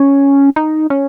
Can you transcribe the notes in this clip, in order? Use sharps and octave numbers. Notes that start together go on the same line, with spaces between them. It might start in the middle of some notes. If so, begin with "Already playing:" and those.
Already playing: C#4
D#4
C#4